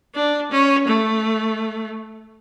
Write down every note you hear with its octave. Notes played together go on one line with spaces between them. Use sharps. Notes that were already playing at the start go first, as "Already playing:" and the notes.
D4
C#4
A3